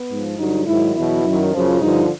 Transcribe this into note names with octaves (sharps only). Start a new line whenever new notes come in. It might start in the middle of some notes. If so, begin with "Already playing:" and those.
Already playing: B3
G#2 F3
G2 D3 F#3 D#4
G#2 D#3 F#3 E4
E2 B2 F#3 E4
F#2 D#3 F#3
F#2 C#3 F3
G2 D3 F3 D#4